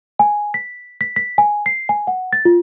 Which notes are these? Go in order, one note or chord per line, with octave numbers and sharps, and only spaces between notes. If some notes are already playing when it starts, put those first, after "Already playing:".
G#5
B6
B6
B6
G#5
C7
G#5
F#5
A6
F4